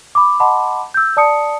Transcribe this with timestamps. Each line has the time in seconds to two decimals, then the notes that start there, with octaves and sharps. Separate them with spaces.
0.15 B5 D6
0.40 D#5 F#5 A5 B5 C6 D6
0.94 E6 G6
1.17 D5 A5 D#6 C#7